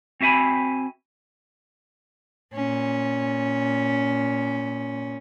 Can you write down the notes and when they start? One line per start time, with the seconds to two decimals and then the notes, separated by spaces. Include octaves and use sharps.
0.21 C4 F#4 E5 G#5 B5
2.54 A#2 C#4